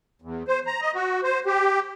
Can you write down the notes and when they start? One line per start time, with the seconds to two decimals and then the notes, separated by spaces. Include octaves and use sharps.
0.22 E2
0.48 C5
0.67 A#5
0.81 D#5
0.95 F#4
1.23 C5
1.46 G4